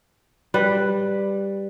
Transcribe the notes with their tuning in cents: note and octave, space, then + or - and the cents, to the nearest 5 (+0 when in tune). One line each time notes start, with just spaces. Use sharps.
G3 +5 B4 +0